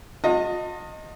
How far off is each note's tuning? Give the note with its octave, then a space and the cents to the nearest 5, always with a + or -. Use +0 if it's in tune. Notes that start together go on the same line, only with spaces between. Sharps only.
F4 +45 D#5 +0 A5 +40